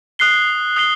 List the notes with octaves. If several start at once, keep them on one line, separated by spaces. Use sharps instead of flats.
D#6 F#6 C7 G7
D#6 F#6 C7 G7